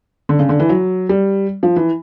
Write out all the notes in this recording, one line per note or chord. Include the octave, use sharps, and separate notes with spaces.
D3
C#3
D3
E3
F#3
G3
F3
E3